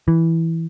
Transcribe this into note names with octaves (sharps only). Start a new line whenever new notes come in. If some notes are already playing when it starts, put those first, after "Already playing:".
E3